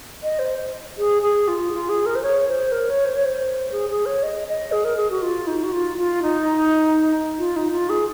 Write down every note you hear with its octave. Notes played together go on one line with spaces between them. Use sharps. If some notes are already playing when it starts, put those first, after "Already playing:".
D#5
C5
G#4
G#4
F4
F4
G#4
A#4
C5
C#5
C5
A#4
C#5
C5
C#5
C5
G#4
G#4
C#5
D#5
D#5
G#4
A#4
G#4
F#4
F4
D#4
F#4
F4
F4
D#4
F4
D#4
F4
G#4